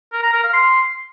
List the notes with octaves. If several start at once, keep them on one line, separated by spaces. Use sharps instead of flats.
A#4
A#5
A#4
F5
C6